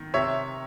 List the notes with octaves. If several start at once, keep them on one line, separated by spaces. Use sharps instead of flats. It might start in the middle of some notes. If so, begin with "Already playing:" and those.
Already playing: D#3
C3 C#5 E5